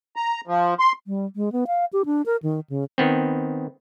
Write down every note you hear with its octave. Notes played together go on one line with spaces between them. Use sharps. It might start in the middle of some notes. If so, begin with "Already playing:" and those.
A#5
F3
C6
G3
G#3
B3
F5
G4
D4
A#4
D#3
C#3
D#3 B3 C4